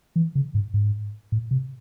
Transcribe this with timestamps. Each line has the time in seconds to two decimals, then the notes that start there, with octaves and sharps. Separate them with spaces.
0.16 E3
0.35 C#3
0.54 G#2
0.74 G#2
1.32 A2
1.51 C3